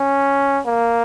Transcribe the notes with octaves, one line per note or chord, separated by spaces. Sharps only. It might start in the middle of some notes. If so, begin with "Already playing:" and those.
Already playing: C#4
A#3